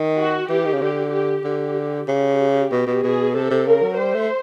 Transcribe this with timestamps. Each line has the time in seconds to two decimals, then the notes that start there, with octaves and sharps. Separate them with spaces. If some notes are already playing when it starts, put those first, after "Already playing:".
Already playing: D#3
0.18 F#4
0.49 E3 G4
0.65 D#3
0.73 C#3
0.81 D3 G4
1.12 G4
1.44 D3 G4
2.08 C#3 G4
2.72 B2
2.87 B2
3.04 B2 G#4
3.35 C3 A4
3.51 C3
3.67 C#3 A#4
3.83 F#3
3.98 G3 C5
4.14 A3